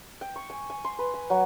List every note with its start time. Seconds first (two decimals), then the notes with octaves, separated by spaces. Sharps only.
0.21 G5
0.36 C#6
0.50 G#5
0.70 G#5
0.85 C6
0.99 B4
1.14 G#5
1.30 F#3